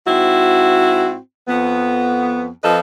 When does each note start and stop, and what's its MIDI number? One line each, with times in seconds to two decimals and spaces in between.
0.06 1.16 44
0.06 1.16 60
0.06 1.16 64
0.06 1.16 66
1.48 2.48 41
1.48 2.48 59
2.63 2.79 41
2.63 2.79 53
2.63 2.79 69
2.63 2.79 71
2.63 2.79 75